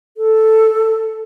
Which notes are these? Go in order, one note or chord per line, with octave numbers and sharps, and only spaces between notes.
A4